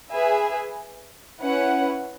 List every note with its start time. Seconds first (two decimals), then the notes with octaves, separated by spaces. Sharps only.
0.10 G#4 B4 E5 G#5
1.40 C#4 E4 B4 F#5